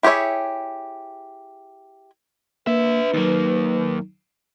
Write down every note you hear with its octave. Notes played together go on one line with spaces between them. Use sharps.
E4 G4 G#4 C#5 E5
A#3 D4 B4 E5
D#2 F#3 A#3 D#4